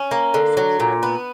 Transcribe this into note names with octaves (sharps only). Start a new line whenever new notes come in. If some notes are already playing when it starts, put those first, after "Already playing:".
Already playing: C#4
A#3
D3
F#3
A#2
B3